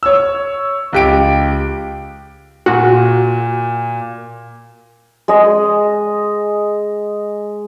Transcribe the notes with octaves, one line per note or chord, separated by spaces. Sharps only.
C#5 E6
C#2 G4 D7
A#2 F#4
G#3 D#5